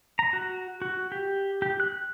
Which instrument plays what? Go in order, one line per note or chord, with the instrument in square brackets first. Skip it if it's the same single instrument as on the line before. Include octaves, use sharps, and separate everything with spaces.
[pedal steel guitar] A#5
F#4
F#4
G4
G4
F#6